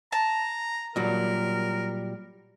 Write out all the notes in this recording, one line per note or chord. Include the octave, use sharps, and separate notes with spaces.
A5 A#5
A#2 F#3 G3 A#4